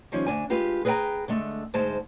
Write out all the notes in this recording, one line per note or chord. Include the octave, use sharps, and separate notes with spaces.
D#3 F3 G3 C#4
D2 D4 G#5
G#3 F4 G4 B4
G#4 B4 D#5 F5 G5 A#5
D3 G#3 A3
D2 G#2 G#3 C5 A5